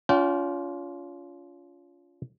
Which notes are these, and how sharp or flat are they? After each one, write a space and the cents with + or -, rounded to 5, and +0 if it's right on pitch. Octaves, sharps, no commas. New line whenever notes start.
C#4 +40 F4 +0 G5 -30